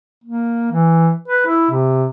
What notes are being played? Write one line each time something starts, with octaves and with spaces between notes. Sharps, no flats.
A#3
E3
B4
E4
C3